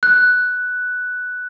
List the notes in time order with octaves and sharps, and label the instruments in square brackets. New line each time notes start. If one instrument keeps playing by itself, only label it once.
[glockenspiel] F#6